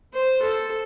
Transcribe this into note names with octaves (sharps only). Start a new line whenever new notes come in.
C5
A4